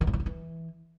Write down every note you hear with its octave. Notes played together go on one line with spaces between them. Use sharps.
D#3
G2
F3
D3
E3